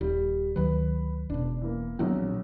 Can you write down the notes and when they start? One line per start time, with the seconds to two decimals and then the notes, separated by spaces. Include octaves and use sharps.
0.01 D#1 G3
0.56 D2 D#3 F#3 B4
1.30 E1 B2 D4
1.61 E3 A#3
1.99 A#1 A#2 F#3 B3 C4